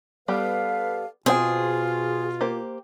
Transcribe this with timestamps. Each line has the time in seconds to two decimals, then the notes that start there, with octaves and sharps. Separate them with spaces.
0.28 G3 B3 G4 A4 B4 F5
1.26 B2 C4 F4 G#4 C5 G5
2.41 A#3 G4 C5